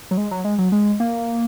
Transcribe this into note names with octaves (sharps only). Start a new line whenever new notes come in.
F#3
G#3
F#3
G#3
F#3
G#3
A#3